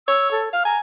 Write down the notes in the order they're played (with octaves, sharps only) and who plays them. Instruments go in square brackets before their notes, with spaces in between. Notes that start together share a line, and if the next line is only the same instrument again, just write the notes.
[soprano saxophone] C#5 [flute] E6
[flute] A4
[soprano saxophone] F5 [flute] F6
[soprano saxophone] G#5 [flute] A#5